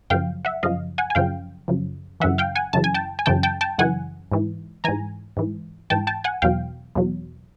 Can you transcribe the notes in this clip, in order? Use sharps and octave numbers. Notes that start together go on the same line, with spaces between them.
F#2 C#3 F3 F5 G5
E5 F#5
F#2 C#3 F3 D#5 F5
F#5 G#5
G#5
F#2 C#3 F3 F5 G5
F#2 C#3 F3
F#2 C#3 E3 E5 F#5
F5 G5
F#5 G#5
F#2 C#3 E3 A5
G#5
G5 A5
G#5
F#2 C#3 E3 G5 A5
G5 A5
G5 A5
F#2 C#3 E3 F#5 G#5
G#2 E3
G#2 E3 G#5 A#5
G#2 E3
G#2 E3 G5 A5
G5 A5
F#5 G#5
E2 B2 F#3 F5 G5
E2 B2 F#3